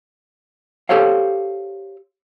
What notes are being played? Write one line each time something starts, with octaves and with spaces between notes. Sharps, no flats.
G4 A4 C5 C#5 F5